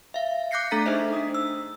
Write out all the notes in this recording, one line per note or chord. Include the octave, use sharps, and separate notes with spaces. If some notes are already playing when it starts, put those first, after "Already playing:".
E5 F5
D6 F#6 G6 A#6 C7 C#7
A3 D4 A4 A#5 A6 B6
D#4 G#4 C5 D#5 E5
D4 D#6
E6